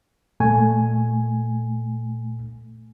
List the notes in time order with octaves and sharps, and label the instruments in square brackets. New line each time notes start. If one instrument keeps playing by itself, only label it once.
[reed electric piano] A#2 A3 G#5